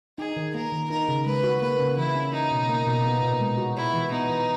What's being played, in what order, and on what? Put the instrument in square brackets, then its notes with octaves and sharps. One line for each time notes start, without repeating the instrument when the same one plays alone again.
[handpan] D#4 [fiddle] G#4
[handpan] D#3
[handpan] A#3 [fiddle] A#4
[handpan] D#3
[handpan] D#4 [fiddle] A#4
[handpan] C#3
[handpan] G#3 [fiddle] B4
[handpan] F#4
[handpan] A#3 [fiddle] B4
[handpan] C#3
[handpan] E3 [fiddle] E4
[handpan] C#4
[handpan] C#4 [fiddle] D#4
[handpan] B2
A#3
B2
B3
A#2
G#3
F#4
[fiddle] E4 [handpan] F#4
[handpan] E3
[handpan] B3 [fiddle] D#4
[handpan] E3